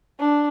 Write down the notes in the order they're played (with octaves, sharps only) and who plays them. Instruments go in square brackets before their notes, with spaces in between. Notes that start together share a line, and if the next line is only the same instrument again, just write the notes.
[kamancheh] D4